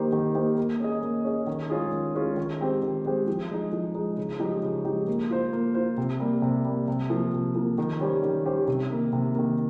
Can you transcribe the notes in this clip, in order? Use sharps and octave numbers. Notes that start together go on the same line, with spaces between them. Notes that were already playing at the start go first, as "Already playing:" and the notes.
Already playing: D#3 A#3 D#4 G4 C5
D#3
A#3 D#4 G4 C5
A#3
C#4 G#4 D#5
A#3
C#4 G#4 D#5
D#3
G#3 C#4 F4 G#4
D#3
G#3 C#4 F4 G#4
D#3
G#3 C4 G4 C5
D#3
G#3 C4 G4 C5
F3
G#3 D#4
F3
G#3 D#4
C#3
F3 G#3 D#4 G4
C#3
F3 G#3 D#4 G4
A#3
F4 C5
A#3
F4 C5
C3
G3 A#3
C3
G3 A#3
C3
F3 A#3
C3
F3 A#3
D#3
G3 C#4 G4 C5
D#3
G3 C#4 G4 C5
C3
D#3 A#3
C3
D#3 A#3